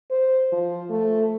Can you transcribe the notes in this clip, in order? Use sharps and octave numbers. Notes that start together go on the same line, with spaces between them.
C5
F3
A3